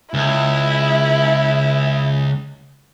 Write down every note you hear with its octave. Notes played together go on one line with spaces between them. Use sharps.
C#2 E4